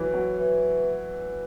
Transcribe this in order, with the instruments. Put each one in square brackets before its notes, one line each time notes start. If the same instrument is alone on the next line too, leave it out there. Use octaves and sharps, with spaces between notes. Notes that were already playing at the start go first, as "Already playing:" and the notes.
Already playing: [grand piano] E3 F#3
F#3
[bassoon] E3